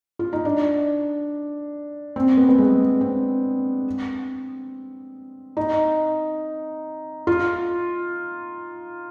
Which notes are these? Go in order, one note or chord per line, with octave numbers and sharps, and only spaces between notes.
F4
D#4
D4
C4
B3
B3
G#3
C4
D#4
F4